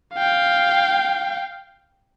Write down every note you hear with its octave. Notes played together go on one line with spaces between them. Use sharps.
F5 G5